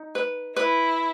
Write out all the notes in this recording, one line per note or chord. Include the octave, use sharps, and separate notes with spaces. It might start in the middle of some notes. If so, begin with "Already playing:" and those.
Already playing: D#4
B4
E4 B4